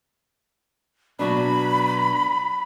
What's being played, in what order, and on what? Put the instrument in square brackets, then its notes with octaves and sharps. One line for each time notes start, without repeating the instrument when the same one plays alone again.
[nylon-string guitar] B2 F#3 D4 [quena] B5